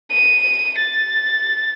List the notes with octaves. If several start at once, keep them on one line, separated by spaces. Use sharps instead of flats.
D#7
A6